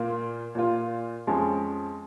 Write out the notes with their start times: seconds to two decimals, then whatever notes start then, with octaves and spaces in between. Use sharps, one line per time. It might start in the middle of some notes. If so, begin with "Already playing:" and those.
Already playing: A#2 A#3 F4
0.55 A#2 A#3 F4
1.27 F2 F3 G#3 C#4